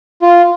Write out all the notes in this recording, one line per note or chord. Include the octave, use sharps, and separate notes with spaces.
F4